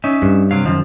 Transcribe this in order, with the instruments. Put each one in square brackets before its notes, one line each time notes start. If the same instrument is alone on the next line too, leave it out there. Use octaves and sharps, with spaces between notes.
[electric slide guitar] C#4 D#4 E5
[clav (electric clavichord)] G2
[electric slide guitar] C3 F#3 F5
F#2 D#3 F3